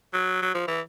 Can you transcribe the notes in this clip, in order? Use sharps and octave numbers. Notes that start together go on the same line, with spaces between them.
F#3
F#3
F3
E3